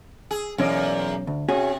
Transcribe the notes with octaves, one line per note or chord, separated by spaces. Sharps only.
G#4
B1 E2 A#3 C#4 D#5
D2
C3 C#4 F#4 G#4